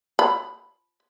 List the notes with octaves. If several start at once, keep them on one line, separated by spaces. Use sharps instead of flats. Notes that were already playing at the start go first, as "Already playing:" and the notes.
B5